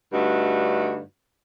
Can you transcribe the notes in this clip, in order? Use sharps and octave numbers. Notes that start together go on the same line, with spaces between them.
G2 D3 A3 D#4 F#4